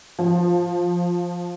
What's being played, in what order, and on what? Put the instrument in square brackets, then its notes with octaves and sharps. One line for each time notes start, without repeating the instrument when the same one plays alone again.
[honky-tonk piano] F3